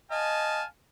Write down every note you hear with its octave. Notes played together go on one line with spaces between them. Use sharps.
D#5 F5 G#5 A5